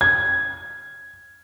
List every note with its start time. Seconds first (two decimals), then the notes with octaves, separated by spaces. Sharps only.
0.01 G#6